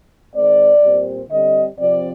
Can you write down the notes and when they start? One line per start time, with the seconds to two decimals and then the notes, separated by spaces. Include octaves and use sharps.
0.34 D#3 G#3 C4 D5
0.81 A#2 G3 C4
1.30 D3 G3 C4 D#5
1.78 C3 F3 C4 D5